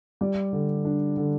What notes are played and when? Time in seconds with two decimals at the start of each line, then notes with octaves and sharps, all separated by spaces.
0.21 G3 D5
0.53 D3
0.85 D4
1.17 D3